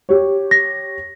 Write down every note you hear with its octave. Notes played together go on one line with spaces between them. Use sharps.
G4 C#5
A#6